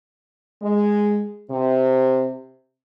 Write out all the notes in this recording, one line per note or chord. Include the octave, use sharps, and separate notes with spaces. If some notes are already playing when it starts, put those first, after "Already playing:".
G#3
C3